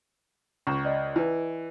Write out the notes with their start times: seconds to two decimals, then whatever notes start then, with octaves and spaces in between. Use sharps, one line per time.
0.67 C#2 A#5 C#6
0.85 D5 D#5
1.16 E3 E4 B4